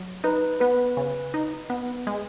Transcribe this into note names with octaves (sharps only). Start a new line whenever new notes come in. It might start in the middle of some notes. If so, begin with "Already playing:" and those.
Already playing: F#3
D#4 B4
B3 B4
C#3
D#4
B3
G#3